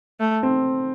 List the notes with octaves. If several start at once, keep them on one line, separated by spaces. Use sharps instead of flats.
A3
C4